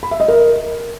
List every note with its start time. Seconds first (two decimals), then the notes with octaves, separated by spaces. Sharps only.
0.03 B5
0.11 E5
0.20 D#5
0.28 A#4